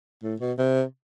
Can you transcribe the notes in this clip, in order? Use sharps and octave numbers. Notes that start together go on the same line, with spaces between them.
A2
B2
C3